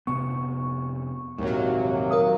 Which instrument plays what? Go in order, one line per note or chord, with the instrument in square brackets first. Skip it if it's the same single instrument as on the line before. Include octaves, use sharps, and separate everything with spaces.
[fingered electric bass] F1 C3 B3 [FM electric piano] C#6
[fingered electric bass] A#1 G#2 [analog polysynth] D#2 F#3 [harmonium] C3 A#3
[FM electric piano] A#4 F5 D#6